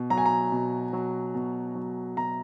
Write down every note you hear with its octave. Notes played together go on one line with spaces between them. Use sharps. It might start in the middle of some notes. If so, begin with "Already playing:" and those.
Already playing: B2
F#3 A#5
G#5
A#5
B2
F#3
B2
F#3
B2 A#5